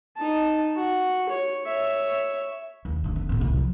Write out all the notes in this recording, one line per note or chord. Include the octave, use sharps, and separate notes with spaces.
D#4 A5
F#4
C#5
C#5 E5
D#2 G#3
D3 A3
B3
A2 B3
C2
F3 F#3